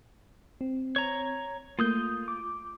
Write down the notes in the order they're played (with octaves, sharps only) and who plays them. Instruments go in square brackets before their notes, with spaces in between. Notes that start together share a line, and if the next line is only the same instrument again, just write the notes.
[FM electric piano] C4
[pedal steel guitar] C#5 A#5
[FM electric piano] A3 A#3 [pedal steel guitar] F4 D#6 G6
[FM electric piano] D6